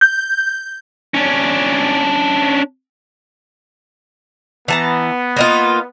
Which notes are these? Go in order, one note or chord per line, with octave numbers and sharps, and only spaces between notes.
G6
C#4 D4
E3 B3 A5 A#5
A#3 D#4 F4